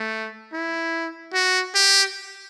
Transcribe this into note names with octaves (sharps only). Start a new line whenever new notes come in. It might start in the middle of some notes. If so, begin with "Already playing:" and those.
Already playing: A3
E4
F#4
G4